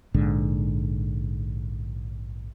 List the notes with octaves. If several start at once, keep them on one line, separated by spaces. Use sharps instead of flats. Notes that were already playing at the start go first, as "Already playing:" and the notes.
A#1 G#2 D3